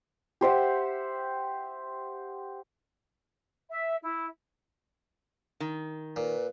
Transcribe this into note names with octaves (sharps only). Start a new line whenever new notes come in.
G4 C5 E5 F#5
E5
E4
D#3
A#2 B4